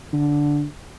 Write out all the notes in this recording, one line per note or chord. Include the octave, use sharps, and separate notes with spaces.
D3